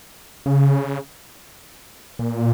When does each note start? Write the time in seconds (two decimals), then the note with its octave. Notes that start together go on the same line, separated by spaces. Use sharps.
0.46 C#3
2.19 A#2